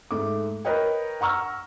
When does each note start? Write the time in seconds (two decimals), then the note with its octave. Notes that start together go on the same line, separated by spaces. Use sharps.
0.11 G#2 A3 D6
0.65 A#4 B4 C#5 D#5 G5
1.21 F#5 A#5 C#6 E6 F6